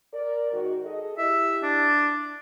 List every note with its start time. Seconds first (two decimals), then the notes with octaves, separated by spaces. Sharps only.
0.14 A#4 D5
0.52 G#2 D#3 F#4
0.85 G#4 A4 D#5
1.18 E4 G4 E5
1.63 D4